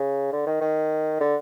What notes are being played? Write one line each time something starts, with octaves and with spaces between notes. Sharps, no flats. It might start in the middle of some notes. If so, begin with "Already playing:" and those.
Already playing: C#3
D3
D#3
D#3
D3